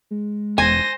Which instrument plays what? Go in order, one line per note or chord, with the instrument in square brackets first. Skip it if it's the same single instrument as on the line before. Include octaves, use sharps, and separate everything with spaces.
[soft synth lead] G#3
[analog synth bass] E1 [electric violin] C5 A#6 [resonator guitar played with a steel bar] G#5